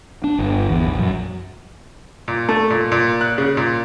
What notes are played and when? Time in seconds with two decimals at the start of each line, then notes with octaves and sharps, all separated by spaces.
0.24 D4
0.39 G1
0.70 E2
0.87 A#1
0.99 F#2
2.28 A#2
2.49 A3
2.70 A#2
2.92 A#2
3.21 F#6
3.38 C#3
3.57 A#2